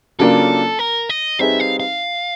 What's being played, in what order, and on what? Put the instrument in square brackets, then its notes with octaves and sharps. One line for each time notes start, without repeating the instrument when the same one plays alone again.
[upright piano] C#3 F#3 A#3 D4 F4 [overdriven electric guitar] A4
[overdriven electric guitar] A#4
D#5
[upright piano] G3 C4 D#4 G#4 B4 [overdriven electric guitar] E5
[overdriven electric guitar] F5
F5